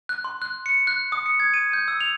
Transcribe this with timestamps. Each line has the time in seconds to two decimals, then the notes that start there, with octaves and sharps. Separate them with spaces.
0.09 F#6
0.24 C6
0.42 F#6
0.66 C#7
0.87 F#6
1.12 D#6
1.26 C#7
1.40 G#6
1.54 D#7
1.73 G6
1.88 E6
2.01 F7